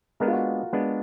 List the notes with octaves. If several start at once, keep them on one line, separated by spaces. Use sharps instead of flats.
G#3 B3 D4 A#4
F4
F#4
G#3 B3 D4